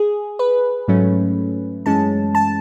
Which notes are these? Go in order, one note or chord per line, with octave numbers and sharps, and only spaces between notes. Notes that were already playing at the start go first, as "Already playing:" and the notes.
Already playing: G#4
B4
G#2 F#3 A3 C#4
F#2 E3 G#3 C#4 A5
A5